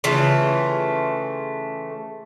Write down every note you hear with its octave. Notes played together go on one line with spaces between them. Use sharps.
C#3 E3 A3 F4